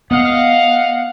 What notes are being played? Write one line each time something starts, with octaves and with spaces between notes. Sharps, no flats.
B3 D#5 F5 F#5